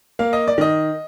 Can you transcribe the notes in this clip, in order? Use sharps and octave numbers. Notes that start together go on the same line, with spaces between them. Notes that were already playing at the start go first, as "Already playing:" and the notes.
A#3 F5
D#5
D5
D#3 D#5